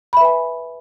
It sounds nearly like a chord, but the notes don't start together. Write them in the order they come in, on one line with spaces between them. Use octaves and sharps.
B5 E5 B4 G#5